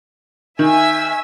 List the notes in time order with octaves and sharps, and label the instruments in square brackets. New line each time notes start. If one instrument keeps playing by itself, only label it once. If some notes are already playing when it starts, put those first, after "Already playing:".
[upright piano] D#3 [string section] E5 G#5 E6